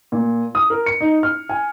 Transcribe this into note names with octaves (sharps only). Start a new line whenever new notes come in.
A#2
D#6
A#4
C#7
D#4
F6
G#5